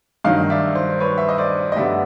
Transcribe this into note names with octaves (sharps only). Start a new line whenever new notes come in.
G2 D#3 F#3 D#5 F5
D5 E5
C5
B4 C#5
E5
D#5
C5 D5
D#5
G2 D3 G3 B3 D5 E5